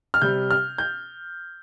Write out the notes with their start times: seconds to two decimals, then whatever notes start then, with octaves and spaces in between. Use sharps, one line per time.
0.14 F6
0.22 C3 G3 G6
0.51 F6
0.78 G6